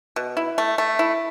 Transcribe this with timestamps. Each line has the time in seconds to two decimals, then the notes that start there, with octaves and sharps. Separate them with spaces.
0.16 B2
0.37 E4
0.58 A3
0.78 A3
0.99 E4